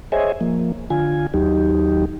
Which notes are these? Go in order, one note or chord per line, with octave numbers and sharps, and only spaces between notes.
G#4 C5 C#5 D#5 E5 G#5
F3 A#3
D3 F4 G#5
D#2 F#3 D#4 G4